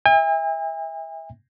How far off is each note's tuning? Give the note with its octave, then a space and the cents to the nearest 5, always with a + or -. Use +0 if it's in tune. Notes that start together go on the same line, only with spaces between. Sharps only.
E5 -20 G#5 -45